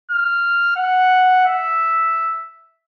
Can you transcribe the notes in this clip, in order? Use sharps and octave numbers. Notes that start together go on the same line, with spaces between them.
F6
F#5
E5